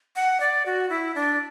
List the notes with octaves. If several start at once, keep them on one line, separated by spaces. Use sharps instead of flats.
F#5
D5
F#4
E4
D4